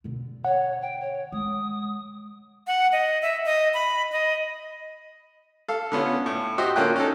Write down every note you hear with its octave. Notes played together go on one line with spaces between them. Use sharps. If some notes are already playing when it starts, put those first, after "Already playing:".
B2 D3
C#5 F#5
G5
C#5
G#3 D#6
F#5
D#5
E5
D#5
B5
D#5
A4 F5
D3 B3 C#4 F4
A2
F#4 G4 C5 D#5 E5
D3 A#3 C#4 F4 G5 F#6
C#4 D#4 A4